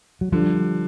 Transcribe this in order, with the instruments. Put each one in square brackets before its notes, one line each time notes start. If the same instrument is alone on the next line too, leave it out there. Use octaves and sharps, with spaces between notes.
[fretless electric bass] F#3
[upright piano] D3 [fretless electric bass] F3 G3